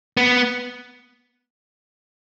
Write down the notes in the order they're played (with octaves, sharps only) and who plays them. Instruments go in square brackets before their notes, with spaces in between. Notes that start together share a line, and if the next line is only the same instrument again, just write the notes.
[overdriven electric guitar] B3